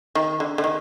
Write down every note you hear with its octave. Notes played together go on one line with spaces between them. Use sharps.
D#3
D3
D3
D#3